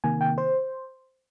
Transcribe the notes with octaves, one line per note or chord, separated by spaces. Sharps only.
C3 D#3 A#3 G#5
G5
C5